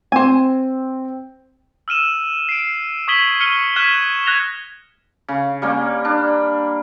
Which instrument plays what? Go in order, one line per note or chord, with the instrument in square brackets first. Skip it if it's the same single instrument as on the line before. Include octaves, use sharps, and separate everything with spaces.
[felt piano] C4 [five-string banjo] C5 G#5
[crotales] E6 F6 D#7 E7
C7 D7
C#6 D#6 G#6 B6 F#7 G7
F6 C#7 D#7 G7
C#6 F6 F#6 G#6 B6 E7
F#6 G#6 A#6 F7 G7
[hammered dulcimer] C#3
G3 A#3 C#4
D4